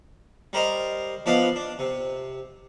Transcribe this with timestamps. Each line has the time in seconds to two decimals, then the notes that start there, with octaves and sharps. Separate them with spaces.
0.53 G3 A#4 C5 D#5 A#5
1.26 F3 B3 D4 D5 D#5 F5
1.56 D4
1.79 C3